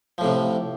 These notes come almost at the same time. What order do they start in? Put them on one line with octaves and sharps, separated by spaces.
F3 A2 C3